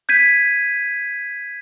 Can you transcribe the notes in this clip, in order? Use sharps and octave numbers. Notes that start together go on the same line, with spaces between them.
G6 G#6 B6 D#7